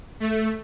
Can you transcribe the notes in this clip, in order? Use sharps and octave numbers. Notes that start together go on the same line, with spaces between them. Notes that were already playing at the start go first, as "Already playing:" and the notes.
A3